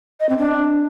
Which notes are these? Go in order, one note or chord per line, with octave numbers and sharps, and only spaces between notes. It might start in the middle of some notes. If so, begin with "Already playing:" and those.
D#5
C4
D4